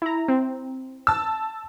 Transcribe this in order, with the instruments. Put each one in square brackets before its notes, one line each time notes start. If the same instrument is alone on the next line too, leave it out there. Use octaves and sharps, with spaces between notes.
[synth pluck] E4 A#5
C4
[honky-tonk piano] A5 E6